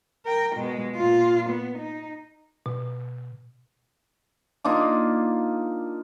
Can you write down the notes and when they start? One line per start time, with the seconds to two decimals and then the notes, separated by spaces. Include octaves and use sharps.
0.26 A#4 G5
0.56 B2 G#3
0.96 A#2 F4
1.50 B3
1.79 D#4
2.66 B2
4.64 A#3 D4 D#4 F4